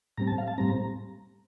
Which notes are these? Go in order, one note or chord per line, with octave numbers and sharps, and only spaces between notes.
A2 G3 C4 A#5
A5
F5
A5
A2 G3 C4 A#5